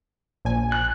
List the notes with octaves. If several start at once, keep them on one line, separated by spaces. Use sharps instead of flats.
A#1 G#5
F#6